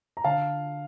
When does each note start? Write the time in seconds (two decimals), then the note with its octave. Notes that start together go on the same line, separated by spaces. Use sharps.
0.17 A#5
0.24 D3 F5 A5